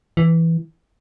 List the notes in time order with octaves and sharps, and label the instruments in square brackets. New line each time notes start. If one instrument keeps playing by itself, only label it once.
[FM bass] E3